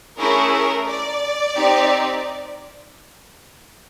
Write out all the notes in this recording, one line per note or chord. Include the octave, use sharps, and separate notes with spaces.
A3 C#4 E4 G#4 A#4
A#4
D5
C4 D#4 G4